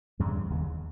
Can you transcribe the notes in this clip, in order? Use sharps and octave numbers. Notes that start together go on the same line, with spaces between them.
E2 G2 C#3 G3
D#2 C#3